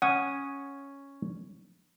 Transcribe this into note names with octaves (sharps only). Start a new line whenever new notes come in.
C#4 F#5 G#5 D#6